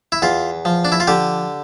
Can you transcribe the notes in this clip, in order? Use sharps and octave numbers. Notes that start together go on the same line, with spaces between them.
E4
E2 F4
F3
D4
E4
F4
D3 G4